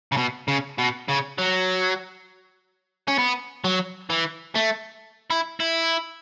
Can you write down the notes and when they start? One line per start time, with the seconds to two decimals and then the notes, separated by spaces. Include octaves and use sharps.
0.12 C#3
0.17 B2
0.48 C#3
0.78 B2
1.08 C#3
1.38 F#3
3.08 C#4
3.18 B3
3.64 F#3
4.10 E3
4.55 A3
5.30 E4
5.60 E4